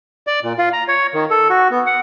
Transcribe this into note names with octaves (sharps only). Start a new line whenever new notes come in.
D5
A#2
F4
A#5
C#5
D#3
A4
F#4
B3
F#5